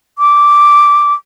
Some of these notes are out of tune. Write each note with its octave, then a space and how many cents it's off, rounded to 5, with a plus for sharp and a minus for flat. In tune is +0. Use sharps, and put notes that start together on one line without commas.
D6 -5